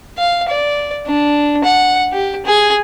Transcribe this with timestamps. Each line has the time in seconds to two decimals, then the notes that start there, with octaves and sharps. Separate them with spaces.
0.18 F5
0.49 D5
1.06 D4
1.64 F#5
2.13 G4
2.46 G#4